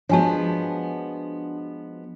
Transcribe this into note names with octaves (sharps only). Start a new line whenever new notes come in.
F3 G#3 B3 D4 F#4 C#5 G#5 A5